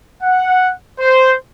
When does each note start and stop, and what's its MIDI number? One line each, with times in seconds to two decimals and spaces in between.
0.23 0.71 78
1.00 1.33 72